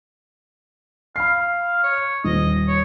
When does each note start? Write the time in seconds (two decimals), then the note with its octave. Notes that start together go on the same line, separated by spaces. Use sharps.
1.16 F5 B5 C7
1.83 C#5
2.24 D#1 D#5
2.68 C#5